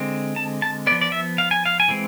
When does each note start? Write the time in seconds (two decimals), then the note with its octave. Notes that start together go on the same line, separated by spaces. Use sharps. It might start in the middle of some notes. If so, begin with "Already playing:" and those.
Already playing: D3 G#3 C4
0.36 A5
0.62 A5
0.87 B3 D5
0.92 F3
1.01 D5
1.12 E5
1.38 F5
1.51 G#5
1.66 F5
1.80 G#5
1.88 E3 G#3 C4